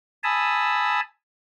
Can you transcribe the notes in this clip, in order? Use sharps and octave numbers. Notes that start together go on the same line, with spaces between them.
G#5 A5 B5 D#6 E6